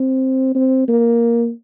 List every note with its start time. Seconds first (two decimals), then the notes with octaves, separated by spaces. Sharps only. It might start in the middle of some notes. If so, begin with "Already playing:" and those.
Already playing: C4
0.55 C4
0.88 A#3